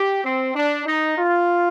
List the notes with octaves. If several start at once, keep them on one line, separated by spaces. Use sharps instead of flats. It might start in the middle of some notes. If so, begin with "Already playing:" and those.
Already playing: G4
C4
D4
D#4
F4